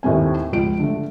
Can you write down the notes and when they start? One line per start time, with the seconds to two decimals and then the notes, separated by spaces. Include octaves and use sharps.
0.03 D#2 A2 A3 C4 G#5
0.52 C#2 F3 D7
0.79 D3 A3